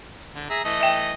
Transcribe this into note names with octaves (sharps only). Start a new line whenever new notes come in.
D3
G#4 E5 A#5
E3 A3 D#5
E5 G5